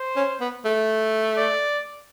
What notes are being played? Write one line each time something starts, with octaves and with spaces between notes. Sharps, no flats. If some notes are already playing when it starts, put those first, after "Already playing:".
Already playing: C5
C#4
B3
A3
D5